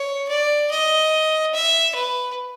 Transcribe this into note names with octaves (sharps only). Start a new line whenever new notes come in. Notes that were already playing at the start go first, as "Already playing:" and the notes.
Already playing: C#5
D5
D#5
E5
B4